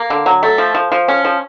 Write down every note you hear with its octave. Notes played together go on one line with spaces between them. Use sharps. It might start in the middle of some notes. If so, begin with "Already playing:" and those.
Already playing: A#3
D3
F#3
A3
F3
F3
F3
C#4
F3